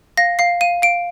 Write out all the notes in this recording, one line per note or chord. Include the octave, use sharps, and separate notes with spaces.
F5 A#6
F5 C7
F5 D#7
F5 D7